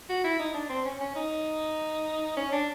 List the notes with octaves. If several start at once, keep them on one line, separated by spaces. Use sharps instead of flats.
F#4
E4
D#4
D4
C4
C#4
C#4
D#4
C#4
D4